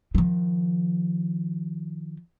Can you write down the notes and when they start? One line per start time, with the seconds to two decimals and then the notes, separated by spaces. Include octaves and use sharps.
0.15 D#3 F3